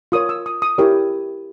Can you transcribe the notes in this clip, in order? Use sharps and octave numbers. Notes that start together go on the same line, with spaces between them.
F4 A#4 C#5 D#6
E6
D#6
D#6
E4 G4 A#4 C#5